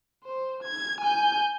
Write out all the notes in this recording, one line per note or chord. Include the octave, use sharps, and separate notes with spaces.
C5
G#6
G#5 G6